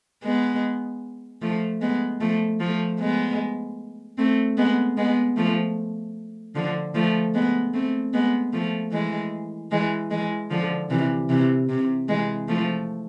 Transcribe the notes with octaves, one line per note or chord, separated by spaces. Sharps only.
G#3 B3
F3 A3
G#3 B3
F3 A3
F3 A3
G#3 B3
A3 C4
G#3 B3
G#3 B3
F3 A3
D3 F3
F3 A3
G#3 B3
A3 C4
G#3 B3
F3 A3
E3 G#3
E3 G#3
E3 G#3
D3 F3
C3 E3
C3 E3
C3
E3 G#3
F3 A3